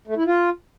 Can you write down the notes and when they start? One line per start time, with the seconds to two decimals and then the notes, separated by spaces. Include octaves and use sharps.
0.08 A3
0.17 E4
0.26 F4